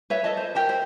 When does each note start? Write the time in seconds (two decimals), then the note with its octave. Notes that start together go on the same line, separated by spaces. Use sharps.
0.10 B4 C#5 E5
0.24 A4 D#5 A5
0.37 C5
0.55 G4 A#4 A5
0.69 C5